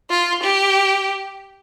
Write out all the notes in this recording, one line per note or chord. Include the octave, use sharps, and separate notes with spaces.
F4
G4